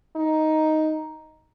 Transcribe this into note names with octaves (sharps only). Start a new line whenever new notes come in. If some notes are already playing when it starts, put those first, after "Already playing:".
D#4